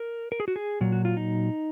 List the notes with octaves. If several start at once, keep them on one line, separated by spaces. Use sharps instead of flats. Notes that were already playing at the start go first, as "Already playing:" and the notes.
Already playing: A#4
A#4
G#4
F#4
G#4
A#2 F#3
F#4
F4
D#4